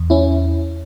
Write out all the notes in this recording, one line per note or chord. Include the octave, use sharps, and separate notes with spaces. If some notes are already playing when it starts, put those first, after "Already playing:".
Already playing: E2
C#4 E4